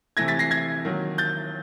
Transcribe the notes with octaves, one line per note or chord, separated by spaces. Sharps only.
C3 E3 A3 G#6 A#6
A6 B6
A#6 C7
G#6 A#6
D#3 F#3 A#3
G6 A6